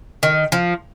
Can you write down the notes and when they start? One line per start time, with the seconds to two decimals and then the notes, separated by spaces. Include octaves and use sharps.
0.23 D#3
0.52 F3